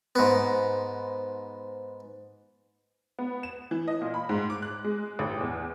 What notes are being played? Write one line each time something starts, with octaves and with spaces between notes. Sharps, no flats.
G#2 B3
B3
E7
E3
D#5
A#2
B5
G#2
D6
F#6
G#3
A1
E2